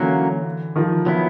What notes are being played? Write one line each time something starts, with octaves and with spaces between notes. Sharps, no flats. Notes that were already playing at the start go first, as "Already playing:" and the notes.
Already playing: D3 E3 F#3 A#3 C#4 F#4
D#3 F3
F#3 B3 E4